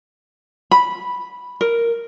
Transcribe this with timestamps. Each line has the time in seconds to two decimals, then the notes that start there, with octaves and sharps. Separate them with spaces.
0.71 B5
1.61 A#4